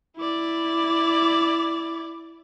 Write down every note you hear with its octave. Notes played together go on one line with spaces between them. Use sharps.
E4 D5